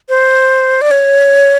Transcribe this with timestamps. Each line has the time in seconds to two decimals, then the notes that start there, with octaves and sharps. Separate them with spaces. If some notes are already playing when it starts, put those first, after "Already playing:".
0.09 C5
0.81 D5
0.91 C#5